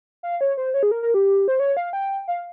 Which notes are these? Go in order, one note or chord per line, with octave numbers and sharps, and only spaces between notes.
F5
C#5
C5
C#5
G#4
A#4
A#4
G4
C5
C#5
F5
G5
F5